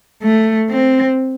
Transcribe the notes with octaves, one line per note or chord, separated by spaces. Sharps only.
A3
C4